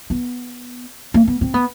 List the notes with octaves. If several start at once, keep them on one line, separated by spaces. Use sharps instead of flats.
B3
A#3
B3
C4
B3